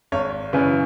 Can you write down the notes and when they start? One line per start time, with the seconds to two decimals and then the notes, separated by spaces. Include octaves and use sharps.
0.12 G#1 C#5
0.53 F#2 C#3 E3 B4